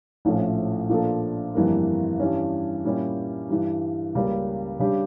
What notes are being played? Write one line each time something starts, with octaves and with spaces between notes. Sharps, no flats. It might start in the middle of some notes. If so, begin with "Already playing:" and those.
A#1 A2 F3 A3 C#4
A#2 F3 A#3 D4 A4
G1 F2 E3 G3 A#3
G2 E3 G3 C#4
A#2 G3 C#4 E4 G4
G2 E3 G3
C#2 C#3 G3 A#3
C#3 G3 D4 G4